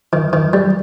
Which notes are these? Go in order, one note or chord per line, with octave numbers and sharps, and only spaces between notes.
D#3
D#3
G3